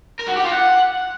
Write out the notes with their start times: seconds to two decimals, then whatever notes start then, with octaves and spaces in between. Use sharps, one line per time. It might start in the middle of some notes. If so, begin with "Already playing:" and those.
0.19 A#4
0.28 F#4
0.36 G4
0.44 F4
0.52 F#5